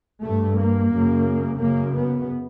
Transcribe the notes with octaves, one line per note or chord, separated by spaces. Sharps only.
G2 A3
A#3
F#2 C#3
F#2 C#3 A#3
B3